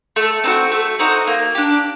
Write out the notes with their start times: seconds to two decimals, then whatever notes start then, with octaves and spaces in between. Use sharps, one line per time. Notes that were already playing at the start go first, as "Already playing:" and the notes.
0.16 A3
0.44 C4 D#4 F#4
0.72 A3
0.99 C4 D#4 F#4
1.27 A#3
1.55 D4 G4